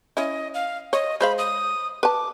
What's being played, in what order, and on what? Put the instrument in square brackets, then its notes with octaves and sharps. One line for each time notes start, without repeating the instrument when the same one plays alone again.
[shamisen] C#4 E4 [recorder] D#5
[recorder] F5
[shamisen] C#5 [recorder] D#5
[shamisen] G#3 C5 F5 [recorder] B5
[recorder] D#6
[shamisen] B4 A5 [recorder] D6